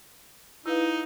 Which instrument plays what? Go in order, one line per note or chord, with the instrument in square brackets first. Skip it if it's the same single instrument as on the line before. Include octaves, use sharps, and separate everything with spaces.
[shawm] D#4 [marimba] E4 B4 F5